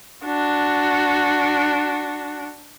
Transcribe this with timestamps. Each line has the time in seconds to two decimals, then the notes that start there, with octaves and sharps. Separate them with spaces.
0.25 D4 F#4